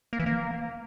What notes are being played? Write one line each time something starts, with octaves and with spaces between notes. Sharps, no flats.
A#3
E3
A#3